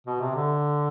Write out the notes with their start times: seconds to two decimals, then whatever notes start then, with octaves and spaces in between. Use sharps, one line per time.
0.07 B2
0.20 C3
0.35 D3